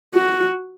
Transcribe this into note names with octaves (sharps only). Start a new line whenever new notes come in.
F#4